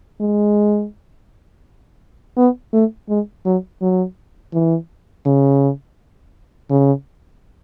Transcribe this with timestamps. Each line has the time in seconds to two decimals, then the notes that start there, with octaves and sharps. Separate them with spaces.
0.21 G#3
2.37 B3
2.73 A3
3.09 G#3
3.45 F#3
3.81 F#3
4.53 E3
5.26 C#3
6.70 C#3